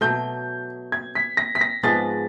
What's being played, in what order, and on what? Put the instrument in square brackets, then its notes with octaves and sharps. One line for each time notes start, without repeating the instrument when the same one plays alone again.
[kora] B2 F#3 A3 [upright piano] G6
[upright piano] G#6
B6
A#6
B6
A#6
[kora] G#2 F3 G#3 B3 [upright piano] A6